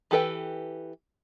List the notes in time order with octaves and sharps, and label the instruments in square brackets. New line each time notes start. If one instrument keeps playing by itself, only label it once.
[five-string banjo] E3 G4 A4 B4 G5